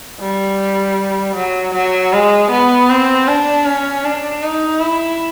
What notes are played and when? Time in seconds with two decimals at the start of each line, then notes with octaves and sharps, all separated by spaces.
0.20 G3
1.36 F#3
1.74 F#3
2.13 G#3
2.51 B3
2.89 C4
3.28 D4
3.65 C#4
4.04 D4
4.42 D#4
4.81 E4